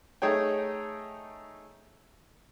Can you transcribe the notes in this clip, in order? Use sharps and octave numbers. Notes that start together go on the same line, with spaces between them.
A3 D#4 G#4 C#5 G5